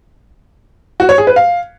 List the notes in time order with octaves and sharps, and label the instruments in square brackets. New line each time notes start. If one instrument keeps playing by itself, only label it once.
[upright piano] F#4
C#5
G#4
B4
F5